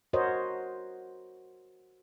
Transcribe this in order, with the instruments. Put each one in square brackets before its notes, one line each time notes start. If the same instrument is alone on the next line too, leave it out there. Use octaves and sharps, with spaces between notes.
[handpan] F#4 A#4 C5 C#5 D#5